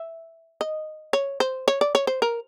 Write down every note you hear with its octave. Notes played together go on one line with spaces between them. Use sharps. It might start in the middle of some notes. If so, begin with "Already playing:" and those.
Already playing: E5
D#5
C#5
C5
C#5
D5
C#5
C5
A#4